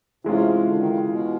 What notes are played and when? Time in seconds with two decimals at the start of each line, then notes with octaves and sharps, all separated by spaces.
0.24 C3 E3 G#3 C#4 F4
0.68 D3
0.78 D#3
0.89 C#3
1.10 B2